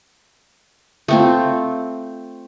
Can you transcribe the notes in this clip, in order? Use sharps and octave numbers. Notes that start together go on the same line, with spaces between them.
A3 C4 F4